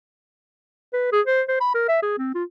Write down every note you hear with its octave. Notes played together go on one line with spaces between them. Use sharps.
B4
G#4
C5
C5
B5
A#4
E5
G#4
C4
F4